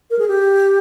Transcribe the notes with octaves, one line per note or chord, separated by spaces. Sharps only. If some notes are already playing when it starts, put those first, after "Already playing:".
A#4
G#4
G4